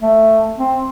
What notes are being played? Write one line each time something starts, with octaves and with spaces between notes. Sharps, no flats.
A3
C4